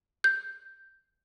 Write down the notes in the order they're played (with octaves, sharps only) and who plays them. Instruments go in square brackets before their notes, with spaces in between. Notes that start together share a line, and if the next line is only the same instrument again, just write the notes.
[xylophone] G6